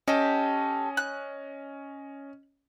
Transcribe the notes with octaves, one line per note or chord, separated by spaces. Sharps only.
C#4 G4 A4 D#5
F#6